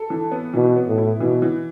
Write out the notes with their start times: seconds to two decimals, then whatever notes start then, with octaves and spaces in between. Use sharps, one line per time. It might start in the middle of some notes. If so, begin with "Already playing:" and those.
Already playing: A4
0.10 E3
0.31 B3
0.54 B2 E3
0.76 B3
0.87 A2
0.98 E4
1.20 B2 E3
1.42 E3